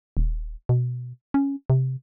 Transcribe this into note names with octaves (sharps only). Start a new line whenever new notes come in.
D#1
B2
C#4
C3